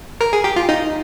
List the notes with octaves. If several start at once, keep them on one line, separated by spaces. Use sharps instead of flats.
A#4
G#4
G4
F4
D#4